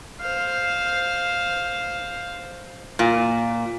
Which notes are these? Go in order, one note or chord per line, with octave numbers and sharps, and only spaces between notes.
C5 F5
A#2